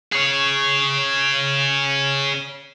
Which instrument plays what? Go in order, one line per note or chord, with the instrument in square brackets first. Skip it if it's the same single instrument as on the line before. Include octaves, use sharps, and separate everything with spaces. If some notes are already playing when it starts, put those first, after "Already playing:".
[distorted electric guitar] G#4 C#5